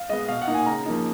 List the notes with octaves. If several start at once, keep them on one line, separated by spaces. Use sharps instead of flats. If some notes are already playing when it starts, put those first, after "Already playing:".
Already playing: F5
G#3 B3 D#5
B2 F5
F#5
A#3 D#4
G#5
C#3 A#5
F3 A#3 D#4